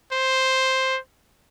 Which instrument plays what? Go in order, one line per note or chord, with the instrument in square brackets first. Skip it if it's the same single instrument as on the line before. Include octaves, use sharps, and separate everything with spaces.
[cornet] C5